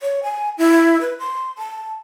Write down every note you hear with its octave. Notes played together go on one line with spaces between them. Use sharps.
C#5
G#5
E4
B4
C6
A5